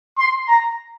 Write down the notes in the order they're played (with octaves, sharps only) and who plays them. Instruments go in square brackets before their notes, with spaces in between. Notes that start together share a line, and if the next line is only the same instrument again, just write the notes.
[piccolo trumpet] C6
A#5